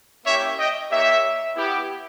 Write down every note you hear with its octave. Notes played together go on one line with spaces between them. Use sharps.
A#3 C#4 E4 G4 C#5 E5
D#5 G5
A#3 D#4 G4 C#5 E5
B3 E4 G4